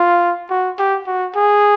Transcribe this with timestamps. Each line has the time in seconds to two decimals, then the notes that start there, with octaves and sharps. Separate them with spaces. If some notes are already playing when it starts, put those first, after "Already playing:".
Already playing: F4
0.50 F#4
0.78 G4
1.07 F#4
1.36 G#4